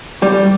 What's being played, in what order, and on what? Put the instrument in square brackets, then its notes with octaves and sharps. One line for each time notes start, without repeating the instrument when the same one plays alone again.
[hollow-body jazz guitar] G3